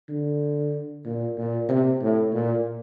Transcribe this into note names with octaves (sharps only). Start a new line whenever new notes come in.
D3
A#2
A#2
C3
A2
A#2